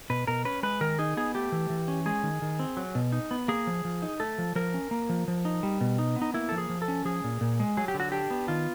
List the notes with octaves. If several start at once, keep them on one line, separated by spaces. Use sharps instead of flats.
B2 B4
B2 A#4
C#4 B4
G#3 B4
D#3 A#4
D#4 G#4
B3 G#4
A3 G4
E3
E3
C#4
G#3 G#4
D#3
D#3
C4
F#3
B2
D#4
B3
A#3 G#4
F3
F3
D#4
A3 A4
F3
F3 A#4
C#4
A#3
F3
F3
D#4
G3
B2
D#4
B3
D#4
A#3 E4
F3 A4
G#4
F3
A4
C#4
F3 G#4
A#2
A#2
G#3
F#3 G#4
G4
D3
F#4
D4 G4
B3
D#3 F4